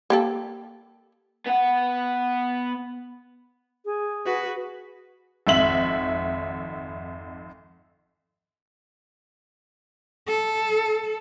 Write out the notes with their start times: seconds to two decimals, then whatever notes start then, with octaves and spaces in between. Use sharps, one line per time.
0.10 A#3 G4 A4
1.47 B3 F#5
3.85 G#4
4.26 F#4 B4
5.47 G#1 F2 E5 F#7
10.27 A4